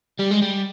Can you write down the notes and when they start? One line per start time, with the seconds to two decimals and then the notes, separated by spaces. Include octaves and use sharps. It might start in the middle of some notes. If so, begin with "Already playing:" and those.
0.19 G3
0.31 G#3
0.42 G3